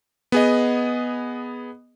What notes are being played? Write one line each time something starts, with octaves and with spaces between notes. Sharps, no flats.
B3 G#4 D#5